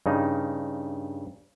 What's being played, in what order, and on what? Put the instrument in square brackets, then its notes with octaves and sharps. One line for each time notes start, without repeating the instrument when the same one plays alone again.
[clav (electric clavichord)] G2 C#3 D#4